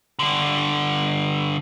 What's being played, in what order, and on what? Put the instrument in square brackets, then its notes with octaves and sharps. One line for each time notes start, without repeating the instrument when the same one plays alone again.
[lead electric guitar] G2 D3